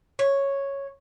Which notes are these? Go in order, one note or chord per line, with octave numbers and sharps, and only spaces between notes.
C#5